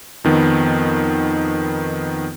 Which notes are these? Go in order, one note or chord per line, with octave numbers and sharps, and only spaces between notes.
F2 D#3 B3